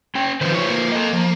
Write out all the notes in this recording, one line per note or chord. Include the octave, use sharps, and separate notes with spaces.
C#4 G5
D#3 F3 F4 B4 C5
E3 C#5
A#3
A4 D#5
F3